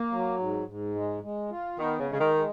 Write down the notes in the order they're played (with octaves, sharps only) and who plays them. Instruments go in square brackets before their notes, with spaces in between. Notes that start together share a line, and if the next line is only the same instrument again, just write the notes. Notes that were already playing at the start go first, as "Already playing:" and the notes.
Already playing: [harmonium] A#3
F#3
G#2
G#2
G#3
G#3
F4
[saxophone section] D#3 [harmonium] B3
[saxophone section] C#3
[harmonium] G#3
[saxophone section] C#3
D#3
[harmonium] G#3